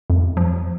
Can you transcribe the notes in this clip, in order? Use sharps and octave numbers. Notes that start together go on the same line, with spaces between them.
F2
F3